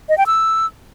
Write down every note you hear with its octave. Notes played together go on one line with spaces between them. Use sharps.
D#5
G5
E6